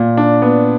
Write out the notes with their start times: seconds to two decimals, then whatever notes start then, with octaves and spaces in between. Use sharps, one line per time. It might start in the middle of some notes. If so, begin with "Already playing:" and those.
Already playing: A#2
0.17 D4
0.42 B3